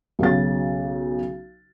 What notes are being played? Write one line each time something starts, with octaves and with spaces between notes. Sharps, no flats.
B1 C#3 F#3 A6